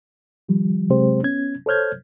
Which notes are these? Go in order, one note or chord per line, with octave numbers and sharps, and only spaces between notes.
D#3 F3 G3
C3 F#3 G#3 C4 G4 C5
B3 C#4 G#6
A4 C5 C#5 F6 G6 G#6